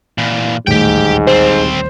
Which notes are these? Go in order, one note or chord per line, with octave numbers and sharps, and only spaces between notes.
A#2 E3
D#1 A1 D2 G#2 G4 G5
G3 C4 C5